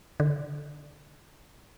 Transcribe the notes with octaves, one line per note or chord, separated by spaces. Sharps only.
D3